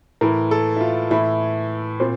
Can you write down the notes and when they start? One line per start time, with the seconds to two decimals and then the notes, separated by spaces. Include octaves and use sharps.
0.21 A2 E3 A#4
0.51 A4
0.77 E4
0.81 F4
1.10 A2 E3 E4
2.00 A#2 C4